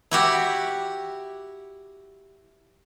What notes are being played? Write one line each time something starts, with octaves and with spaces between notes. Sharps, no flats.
E4 F#4 G4